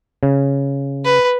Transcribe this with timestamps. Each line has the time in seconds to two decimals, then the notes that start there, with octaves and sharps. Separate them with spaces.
0.23 C#3
1.05 B4